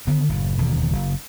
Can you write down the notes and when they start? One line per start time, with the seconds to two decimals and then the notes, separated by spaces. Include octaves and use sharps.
0.07 D3 D#3 B3
0.29 F#1 A2
0.57 E1 D#2 B2 D3
0.92 F#1